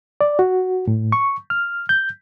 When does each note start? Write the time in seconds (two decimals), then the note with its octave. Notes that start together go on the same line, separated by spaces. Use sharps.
0.21 D5
0.39 F#4
0.88 A2
1.12 C#6
1.50 F6
1.89 G6